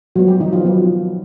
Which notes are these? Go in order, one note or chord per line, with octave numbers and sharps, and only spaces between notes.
F3 F#3 G#3 B3 F#4
G3 G4
D#3 D#4
F3 F4
F#3 B3